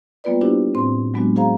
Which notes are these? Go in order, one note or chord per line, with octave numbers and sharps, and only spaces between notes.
G3 A#3 B3 F4 B4 D5
B3 D4 E4 F#4 G4 C5
A2 C4 C5 C6
F#3 G#3 B3 D4 F#4
F#4 G#4 C5 F5 A#5